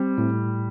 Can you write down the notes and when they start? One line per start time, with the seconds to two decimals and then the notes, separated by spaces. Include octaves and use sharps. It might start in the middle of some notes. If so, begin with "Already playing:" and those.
Already playing: G3 C4
0.18 A2